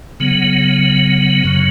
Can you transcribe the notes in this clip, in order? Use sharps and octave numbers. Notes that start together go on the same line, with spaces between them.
C#3 F#3 B3
F#2 C#3 F#3